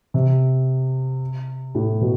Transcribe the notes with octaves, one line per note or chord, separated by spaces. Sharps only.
C3
A2
B2